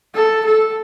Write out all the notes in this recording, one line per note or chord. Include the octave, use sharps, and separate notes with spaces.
A4
A4